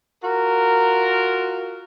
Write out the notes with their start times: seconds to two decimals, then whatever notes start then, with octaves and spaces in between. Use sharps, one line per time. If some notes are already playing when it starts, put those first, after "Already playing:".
0.23 F4 F#4 A#4